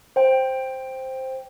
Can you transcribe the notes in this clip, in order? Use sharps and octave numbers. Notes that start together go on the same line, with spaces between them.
C5 G5